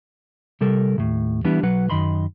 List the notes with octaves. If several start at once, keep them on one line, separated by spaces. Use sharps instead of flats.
C3 G3 A4 A#4
D#2 A2 C3
E3 G3 B3 D4 E4
B1 F#3 B4 F#5
F#2 D#3 D#5 B5 C6